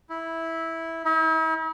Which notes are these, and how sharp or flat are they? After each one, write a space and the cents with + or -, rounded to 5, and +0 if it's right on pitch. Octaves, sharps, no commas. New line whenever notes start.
E4 -10
E4 -45